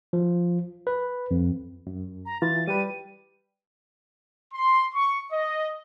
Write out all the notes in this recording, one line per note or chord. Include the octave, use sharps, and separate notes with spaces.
F3
B4
F2
F#2
A#5
E3 F4 A6
G3 G4 B4 D#7
C6
C#6
D#5